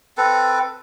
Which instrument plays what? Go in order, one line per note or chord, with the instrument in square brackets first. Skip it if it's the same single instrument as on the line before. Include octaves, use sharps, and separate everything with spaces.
[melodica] C4 A4 B4